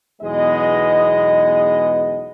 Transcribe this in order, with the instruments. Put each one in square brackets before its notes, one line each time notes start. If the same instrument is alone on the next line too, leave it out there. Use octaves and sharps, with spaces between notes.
[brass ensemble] B1 E2 G#3 B3 G#4 D#5